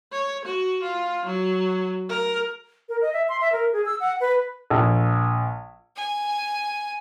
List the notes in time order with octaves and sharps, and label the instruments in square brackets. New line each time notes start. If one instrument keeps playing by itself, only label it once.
[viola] C#5
F#4
F4
F#3
A#4
[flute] A#4
D#5
E5
C6
E5
A#4
G#4
E6
F#5
B4
[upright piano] A#1
[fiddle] G#5